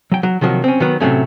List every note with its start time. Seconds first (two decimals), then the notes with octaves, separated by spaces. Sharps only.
0.12 F#3 G5
0.23 F#3
0.41 C3 D#3 F3 F#3 A#3 F#4
0.64 C4 C#4
0.80 D#3 F#3 B3
1.00 A2 C3 F#3 A3 C#4